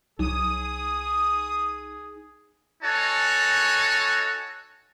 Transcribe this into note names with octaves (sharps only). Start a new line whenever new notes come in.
C2 F#3 D#4 G#4 D#6
D#4 F#4 A4 C#5 G#5 A5